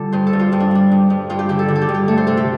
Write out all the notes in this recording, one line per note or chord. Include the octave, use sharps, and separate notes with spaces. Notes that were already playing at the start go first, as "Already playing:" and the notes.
Already playing: D3 G3 F4 G4 A4
G2 C5
A4
G2
F4
G2 F4
D4
G3 D4
G2
G2
G2 F4
G4
D3 G4
A4
D3
A4
G4
G2
G4
A3 A4
C5
C3 A4
G4